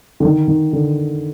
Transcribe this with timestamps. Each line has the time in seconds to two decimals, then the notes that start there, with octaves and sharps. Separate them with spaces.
0.20 D3
0.25 D#3
0.48 D#3
0.73 D3